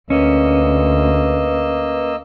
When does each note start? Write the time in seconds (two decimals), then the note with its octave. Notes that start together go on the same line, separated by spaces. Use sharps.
0.10 D2 A#3 C#4 B4 D#5 E6